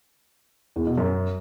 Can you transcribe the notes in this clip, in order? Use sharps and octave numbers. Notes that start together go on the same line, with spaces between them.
E2
B2
F#2